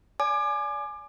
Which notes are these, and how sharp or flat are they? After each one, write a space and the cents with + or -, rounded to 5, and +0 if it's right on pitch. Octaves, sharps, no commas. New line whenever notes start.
D5 -30 G#5 +15 D6 +30